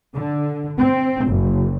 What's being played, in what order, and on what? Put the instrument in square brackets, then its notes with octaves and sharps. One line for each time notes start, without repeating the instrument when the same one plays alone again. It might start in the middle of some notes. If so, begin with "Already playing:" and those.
[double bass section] D3
C4
F#1